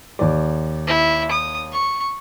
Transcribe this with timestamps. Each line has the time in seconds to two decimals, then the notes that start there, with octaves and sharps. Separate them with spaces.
0.19 D#2 D5
0.87 E4
1.31 D#6
1.72 C#6